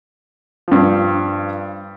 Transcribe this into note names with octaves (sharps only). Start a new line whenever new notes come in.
G2 F3